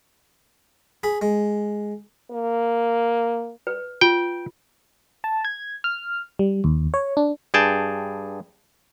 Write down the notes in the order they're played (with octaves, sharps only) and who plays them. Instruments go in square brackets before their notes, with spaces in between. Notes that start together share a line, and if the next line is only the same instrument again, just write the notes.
[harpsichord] G#4 B5
G#3
[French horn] A#3
[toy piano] B4
[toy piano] F4 [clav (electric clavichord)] G5
[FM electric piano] A5
G#6
F6
G3
D#2
C#5
D4
[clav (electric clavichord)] G2 G#4 G5 A5